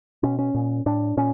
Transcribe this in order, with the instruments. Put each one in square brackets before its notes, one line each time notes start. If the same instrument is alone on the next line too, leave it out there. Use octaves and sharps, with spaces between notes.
[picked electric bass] B2 C#4
C#4
A#2
A2 D4
A#2 C#4